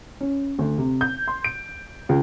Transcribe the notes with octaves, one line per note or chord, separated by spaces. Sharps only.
C#4
D2
C3
G6
C6
D7
C#2